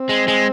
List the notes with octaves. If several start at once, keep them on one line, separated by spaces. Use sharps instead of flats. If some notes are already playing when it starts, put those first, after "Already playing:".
Already playing: C4
G#3
G#3